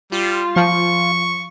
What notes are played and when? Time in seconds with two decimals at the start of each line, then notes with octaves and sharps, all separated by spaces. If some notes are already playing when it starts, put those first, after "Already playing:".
0.12 G3 F4
0.56 F3 C#6